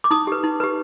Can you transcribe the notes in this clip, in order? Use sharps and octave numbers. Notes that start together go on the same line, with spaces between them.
D6
D#4 D#6
G4 B4
D#4
G4 B4